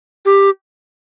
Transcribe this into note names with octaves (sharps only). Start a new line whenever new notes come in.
G4